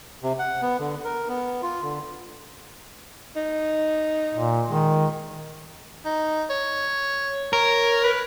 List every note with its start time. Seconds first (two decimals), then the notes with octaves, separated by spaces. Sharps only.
0.23 C3
0.39 F#5
0.62 B3
0.79 D3
1.04 A#4
1.29 B3
1.62 F4
1.83 D3
3.36 D#4
4.35 A#2
4.69 D#3 G#3
6.05 D#4
6.49 C#5
7.53 A#4 C#5
8.03 B4